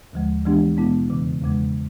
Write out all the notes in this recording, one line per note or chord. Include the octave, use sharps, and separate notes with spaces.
D#2 D3 F3 G#3
E3 G#3 B3 D4 G4
B2 G#3 B3 E4
E2 C#3 E3
E2 C#3 F3 G#3